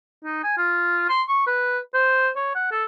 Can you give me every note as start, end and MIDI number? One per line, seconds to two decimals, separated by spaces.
0.24 0.43 63
0.44 0.55 80
0.58 1.09 65
1.09 1.23 84
1.29 1.42 85
1.47 1.79 71
1.94 2.29 72
2.36 2.54 73
2.55 2.70 78
2.71 2.85 69